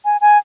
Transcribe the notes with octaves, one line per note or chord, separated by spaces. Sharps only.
G#5
G#5